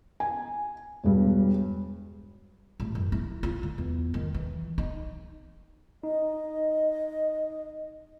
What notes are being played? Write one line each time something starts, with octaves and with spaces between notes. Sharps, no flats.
G#5
E1 G2
A1
F#2
E4
F4
D3
E2
D#3
E3
D#4
D#4 D#5